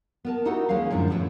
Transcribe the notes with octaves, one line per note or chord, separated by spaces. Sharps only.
B3 A#4 A5
D#4 E4 F#4 G4 A4 F#5
D#2 G#3 A#3 C#4 F5
F#2 A2 D3 F3
F3 A3 C4 G#4 B4 C#5